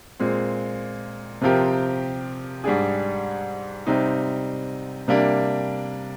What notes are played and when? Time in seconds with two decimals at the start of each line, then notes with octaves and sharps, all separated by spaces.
0.20 A#2 G#3 C4
1.41 C3 F3 C4 G4 A#4
2.64 G#2 G3 D4 G#4
3.87 C3 G3 C4 D#4
5.08 C3 G3 A#3 D4